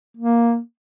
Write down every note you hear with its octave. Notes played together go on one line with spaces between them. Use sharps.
A#3